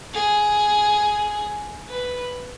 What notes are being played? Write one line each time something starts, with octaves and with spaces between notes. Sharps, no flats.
G#4
B4